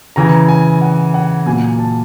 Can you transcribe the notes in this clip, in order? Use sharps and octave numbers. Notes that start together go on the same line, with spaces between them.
C#3 E3 A#5
G#5
F#5
F#5
A#2 F#3 G#5
A5